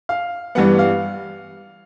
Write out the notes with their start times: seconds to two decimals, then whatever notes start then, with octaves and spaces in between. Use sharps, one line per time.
0.09 F5
0.55 G2 E3 G3 B3 F#5
0.79 F5